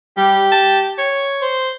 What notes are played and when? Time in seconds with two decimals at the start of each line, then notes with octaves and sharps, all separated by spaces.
0.17 G3 G4
0.52 A5
0.98 C#5
1.41 C5